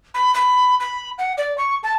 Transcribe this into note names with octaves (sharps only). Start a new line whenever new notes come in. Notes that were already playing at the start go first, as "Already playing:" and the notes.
B5
B5
B5
F#5
D5
C#6
A5